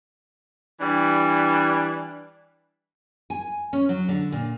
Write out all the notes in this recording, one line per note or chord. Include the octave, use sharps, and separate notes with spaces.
E3 G3 D4
G#5
C#4
F#3
D3
A#2